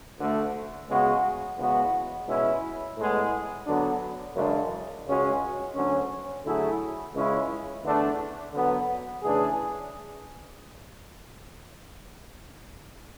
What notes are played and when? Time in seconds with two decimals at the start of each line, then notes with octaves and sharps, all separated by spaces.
0.19 D2 D3 A3
0.88 C#3 G#3 B3 F#4
1.58 E2 C#3 G#3 B3 F#4
2.27 B2 G#3 C#4 E4
2.97 A2 G#3 B3
3.66 D3 F#3 B3 D4
4.36 F#2 C#3 E3 G#3 D4
5.05 C#2 C#3 G#3 C#4 F#4
5.75 D2 D3 F#3 C#4
6.44 D3 F#3 A3 E4 G#4
7.14 C#2 C#3 G#3 C#4 E4
7.84 E2 D3 A3 D4
8.53 D3 F#3 B3
9.23 C#3 E3 A3 D4 G#4